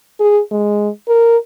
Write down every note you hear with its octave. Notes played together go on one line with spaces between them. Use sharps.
G#4
G#3
A#4